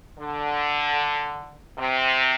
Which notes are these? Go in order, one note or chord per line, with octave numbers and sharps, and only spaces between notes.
D3
C3